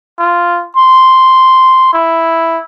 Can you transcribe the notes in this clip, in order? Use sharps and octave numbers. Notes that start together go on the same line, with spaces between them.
F4
C6
E4